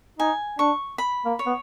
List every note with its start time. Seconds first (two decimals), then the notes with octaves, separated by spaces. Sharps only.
0.19 D#4 G#5
0.59 D4 C#6
0.98 B5
1.25 A#3
1.39 C#5
1.46 B3